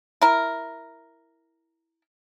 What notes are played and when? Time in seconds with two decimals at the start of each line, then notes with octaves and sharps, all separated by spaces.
0.22 E4 A#4